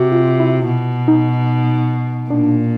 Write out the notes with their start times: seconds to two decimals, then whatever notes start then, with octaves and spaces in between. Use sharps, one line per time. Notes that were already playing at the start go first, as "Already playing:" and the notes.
Already playing: C3 F#4
0.12 F4
0.40 E4
0.67 B2
1.08 D#4
2.30 A#2 D4